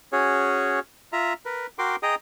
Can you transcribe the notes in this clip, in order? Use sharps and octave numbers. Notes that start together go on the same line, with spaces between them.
C#4 F#4 G#4 C#5
F4 E5 A#5
A#4 B4
F#4 A#4 G5 C6 D6
G#4 D#5 G5 A#5 D#6